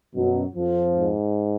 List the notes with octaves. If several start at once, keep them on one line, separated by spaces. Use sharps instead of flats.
F#2 B2 F#3
F2 F3
G#2